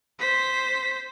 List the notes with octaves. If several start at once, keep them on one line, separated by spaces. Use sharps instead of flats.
C5 B6